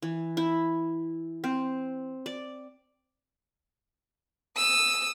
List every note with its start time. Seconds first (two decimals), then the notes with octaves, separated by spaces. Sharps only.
0.02 E3
0.37 E4
1.44 C4
2.26 D5
4.57 D#6 E6